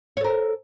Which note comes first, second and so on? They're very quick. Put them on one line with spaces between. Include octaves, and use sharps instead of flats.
C#5 A4 A#4